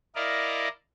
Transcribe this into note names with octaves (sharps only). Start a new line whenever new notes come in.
E4 A#4 D5 D#5 F5